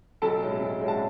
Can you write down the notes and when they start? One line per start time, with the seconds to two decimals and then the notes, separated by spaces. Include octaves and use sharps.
0.22 B1 A4 A5
0.42 A2 G#3 C#4
0.61 B1
0.81 A2 G#3 C#4
0.88 A5